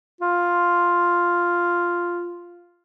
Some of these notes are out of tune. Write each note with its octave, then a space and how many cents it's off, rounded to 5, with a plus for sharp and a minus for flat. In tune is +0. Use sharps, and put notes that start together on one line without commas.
F4 +0